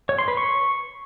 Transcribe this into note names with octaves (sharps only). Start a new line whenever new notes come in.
C#5
C6
B4
C#6